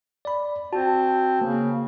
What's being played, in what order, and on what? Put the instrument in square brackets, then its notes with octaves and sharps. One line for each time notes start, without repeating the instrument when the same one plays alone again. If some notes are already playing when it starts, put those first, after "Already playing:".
[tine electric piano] D5 B5
[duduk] C4 [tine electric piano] F#4 [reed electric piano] A5
[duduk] C#3 [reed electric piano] A#3